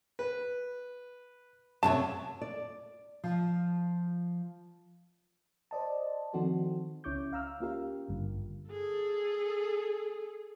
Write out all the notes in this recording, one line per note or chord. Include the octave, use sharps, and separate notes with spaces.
B4
F#2 C3 C#5 A5
D5
F3
C5 D5 D#5 A5
D#3 F3 C4 F#4 A4 C5
C#2 C#4 E4 C#6 D6 G6
F5 A#5 E6 F6
A#3 C#4 F4 G4 A#4 F5
G#1 G2 D3
G#4 A4